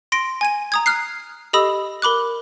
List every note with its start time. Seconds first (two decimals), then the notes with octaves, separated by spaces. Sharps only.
0.12 C6 A#6 D7
0.41 G#5 G#6 D#7
0.72 A#5 D#6 G#6
0.86 F6 F#6 C7
1.53 G4 A4 D#5 B5 D#6 E6
2.02 A#4 B5 D6 F#6